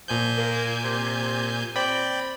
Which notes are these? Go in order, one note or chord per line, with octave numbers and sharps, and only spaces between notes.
A#2 F3 G#5 G6
A#3
C3
C4 D5 G5 B5